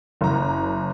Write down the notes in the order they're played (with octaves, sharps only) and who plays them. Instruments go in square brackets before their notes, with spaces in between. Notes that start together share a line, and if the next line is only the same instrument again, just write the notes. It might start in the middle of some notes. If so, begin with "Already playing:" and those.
[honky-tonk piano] F#1 A#5